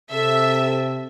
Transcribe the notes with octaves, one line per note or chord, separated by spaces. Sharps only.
C3 A4 E5